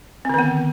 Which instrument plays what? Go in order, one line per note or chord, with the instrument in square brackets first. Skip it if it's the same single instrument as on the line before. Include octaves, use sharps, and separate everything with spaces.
[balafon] C4
D3
D#3
B3